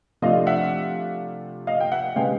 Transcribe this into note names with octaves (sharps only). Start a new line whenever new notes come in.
C3 F3 A3 D4 F4 D#5 F5
E5 F#5
D#5 F5
G5
E5 F#5
C3 E3 G#3 C#4 F5 G5